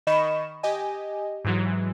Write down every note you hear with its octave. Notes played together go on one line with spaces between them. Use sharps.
D#3 D#5 B5 C#6 E7
G4 D#5 G#5
G#2 E3 F#3